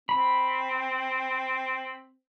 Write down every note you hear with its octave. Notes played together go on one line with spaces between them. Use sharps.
C4 B5